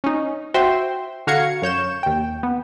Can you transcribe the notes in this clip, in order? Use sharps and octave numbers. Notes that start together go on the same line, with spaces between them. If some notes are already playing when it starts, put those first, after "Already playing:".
C#4 D#4
F#4 C5 E5 G5 C6
D3 F#4 F5 A#5 G#6 C#7
F#2 C#5 G6 E7
D#2 G5
B3